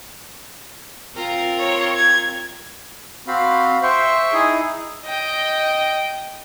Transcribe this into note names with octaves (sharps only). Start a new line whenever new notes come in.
C4 F4 A#4
C#5
G#6
C4 F#4 F5 B5
C5 E5 G5 C#6
D#4 E4 G#4
D#5 G5